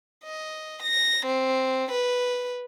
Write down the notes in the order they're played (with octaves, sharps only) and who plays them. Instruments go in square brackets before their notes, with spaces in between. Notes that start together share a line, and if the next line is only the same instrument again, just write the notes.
[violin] D#5
A#6
C4
B4